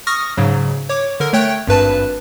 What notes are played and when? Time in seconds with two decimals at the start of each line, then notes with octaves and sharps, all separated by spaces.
0.07 C#6 D#6 F6 A#6
0.37 G#2 C#3 F#3
0.89 C#5 D6
1.20 D3 A#4
1.33 A3 C#5 G5 F#6
1.67 G#1 G2 B4 A5